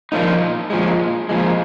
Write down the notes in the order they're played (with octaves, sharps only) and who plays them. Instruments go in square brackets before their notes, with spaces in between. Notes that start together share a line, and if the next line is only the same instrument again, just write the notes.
[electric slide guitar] A#2 F3 A#3 D#4
A#2 F3 G#3
A#2 F3 G#3